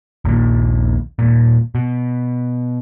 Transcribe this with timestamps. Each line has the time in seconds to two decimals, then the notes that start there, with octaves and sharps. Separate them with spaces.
0.25 A#1 D#2 A#2 D#3
1.19 D#1 A#2
1.75 B2